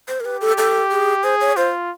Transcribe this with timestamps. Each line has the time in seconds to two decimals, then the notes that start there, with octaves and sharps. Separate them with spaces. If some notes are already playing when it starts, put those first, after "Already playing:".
0.08 C5
0.20 A#4
0.25 G4 B4
0.41 A4
0.58 A4
0.92 G#4
1.24 G#4 C5
1.41 C#5
1.57 F4 C5